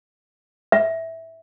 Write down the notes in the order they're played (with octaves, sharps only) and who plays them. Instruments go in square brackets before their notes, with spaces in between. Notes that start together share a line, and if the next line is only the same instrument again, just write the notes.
[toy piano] E5